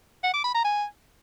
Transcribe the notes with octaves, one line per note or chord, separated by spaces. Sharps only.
F#5
D6
B5
A#5
G#5